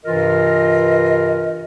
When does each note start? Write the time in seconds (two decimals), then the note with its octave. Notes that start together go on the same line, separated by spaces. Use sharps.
0.05 G2 C3 E3 F4 A#4 D#5